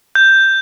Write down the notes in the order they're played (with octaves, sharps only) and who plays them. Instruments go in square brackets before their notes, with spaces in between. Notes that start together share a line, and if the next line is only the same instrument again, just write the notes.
[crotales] G6